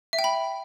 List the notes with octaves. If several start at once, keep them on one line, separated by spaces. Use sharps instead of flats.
E5
G5
B5